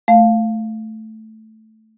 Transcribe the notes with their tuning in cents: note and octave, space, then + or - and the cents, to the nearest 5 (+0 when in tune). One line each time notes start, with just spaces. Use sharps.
A3 +0 F5 +0